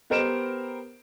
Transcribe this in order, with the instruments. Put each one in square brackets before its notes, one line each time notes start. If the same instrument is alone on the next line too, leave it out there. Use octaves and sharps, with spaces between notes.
[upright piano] B3 G4 A#4 C5 D7 E7